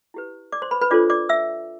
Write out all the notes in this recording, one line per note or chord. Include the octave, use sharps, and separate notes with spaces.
E4 G4 B4
D5 D6
C5 C6
B4 B5
B4 B5
D4 F4 A4 C5 D5 D6
D5 D6
E5 E6